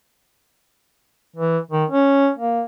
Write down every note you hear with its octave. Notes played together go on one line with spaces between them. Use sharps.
E3
D#3
C#4
A#3